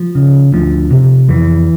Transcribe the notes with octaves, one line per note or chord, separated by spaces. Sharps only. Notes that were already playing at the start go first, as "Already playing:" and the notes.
Already playing: F3
C#3
D2 F3
C3
F2 E3